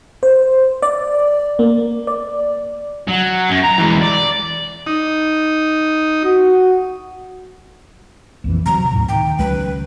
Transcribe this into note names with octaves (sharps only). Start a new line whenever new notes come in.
C5
D5
A#3
D5
F#3
F#2
A#5
E3 G#3
D5
D#4
F#4
A#1 F2 E3
C3 F#3 A#5
D2 A2
D#3 G5
C#2 F#3 B4